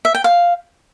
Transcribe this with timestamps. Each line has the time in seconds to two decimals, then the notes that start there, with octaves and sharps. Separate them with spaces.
0.05 E5
0.15 G5
0.24 F5